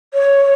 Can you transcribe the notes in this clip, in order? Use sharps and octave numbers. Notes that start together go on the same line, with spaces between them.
C#5